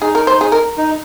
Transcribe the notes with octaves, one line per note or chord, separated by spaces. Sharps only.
D#4 G#4
A#4
C5
G#4
A#4
D#4